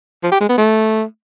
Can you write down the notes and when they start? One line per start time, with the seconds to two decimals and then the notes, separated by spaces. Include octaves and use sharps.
0.23 F3
0.32 G4
0.40 G#3
0.49 B3
0.58 A3